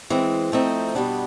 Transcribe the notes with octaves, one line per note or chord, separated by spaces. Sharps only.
E3 G#3 C4
F3 A3 C4 D#4
B2 G3 B3 D4